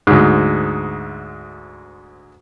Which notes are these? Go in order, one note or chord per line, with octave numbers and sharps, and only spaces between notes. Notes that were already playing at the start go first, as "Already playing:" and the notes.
D2 G#2